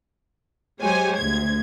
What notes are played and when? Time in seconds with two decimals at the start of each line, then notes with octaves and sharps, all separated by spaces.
0.80 F#3 G#3 G4 C5 C#5 G#5
1.17 D2 G#6